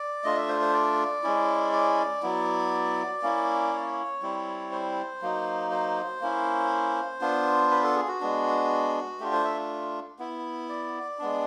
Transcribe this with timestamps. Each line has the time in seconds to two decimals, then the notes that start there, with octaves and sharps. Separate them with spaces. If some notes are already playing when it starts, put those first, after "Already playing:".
Already playing: D5
0.24 A3 D4 F4 D#5
0.37 E5
0.49 C5
0.61 C5
0.73 D5
1.23 G#3 C#4 E4
1.73 D5
2.23 F#3 B3 E4
3.23 A#3 C#4 E4
3.72 C#5
4.22 G3 C4 E4
4.72 C5
5.22 F#3 A#3 D#4
5.71 C5
6.21 A#3 C#4 E4
7.21 B3 D4 F4
7.71 B4
7.83 A4
7.95 G#4
8.08 F#4
8.21 G#3 B3 D4
9.20 A3 D4 F4 G4
9.33 C5
9.44 E5
10.19 B3 E4
10.69 D5
11.19 G#3 B3 D4